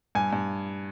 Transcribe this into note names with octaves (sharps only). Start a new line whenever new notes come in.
G2 G#5
G2